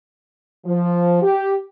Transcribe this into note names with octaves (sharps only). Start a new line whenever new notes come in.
F3
G4